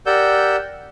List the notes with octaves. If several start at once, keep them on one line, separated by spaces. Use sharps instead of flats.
G4 A#4 D5 F#5 E6 G6